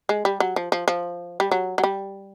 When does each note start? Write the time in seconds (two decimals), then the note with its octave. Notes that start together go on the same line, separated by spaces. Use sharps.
0.09 G#3
0.25 G3
0.40 F#3
0.56 F3
0.72 F3
0.88 F3
1.40 G3
1.51 F#3
1.78 F#3
1.83 G3